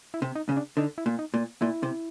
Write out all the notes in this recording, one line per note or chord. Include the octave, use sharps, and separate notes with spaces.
E4
C3
D#4
C#3
D4
D3 D#4
E4
A#2
D#4
A#2
A#2 E4
C3